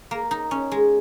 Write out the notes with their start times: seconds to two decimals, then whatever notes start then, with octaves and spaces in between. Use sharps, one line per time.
0.11 A#3
0.31 D#4
0.51 C#4
0.72 G#3